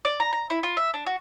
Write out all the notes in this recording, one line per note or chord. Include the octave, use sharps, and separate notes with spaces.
D5
A#5
A#5
E4
F4
E5
D4
F#4